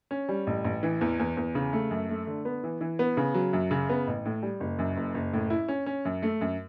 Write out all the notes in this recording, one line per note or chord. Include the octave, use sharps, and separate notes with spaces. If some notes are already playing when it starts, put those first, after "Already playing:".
C#4
G3
A1
A1
E3
E2
E2
E2
C#3
A3
F#2
A3
D3
B3
E3
E3
B3
C#3
F#3
F#2
C#3
B3
A1
A2
G3
F#1
F#2
F#1
F#1
A2
E4
C#4
C#4
F#2
A3
F#2